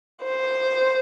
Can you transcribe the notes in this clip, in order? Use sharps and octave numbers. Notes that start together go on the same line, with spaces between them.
C5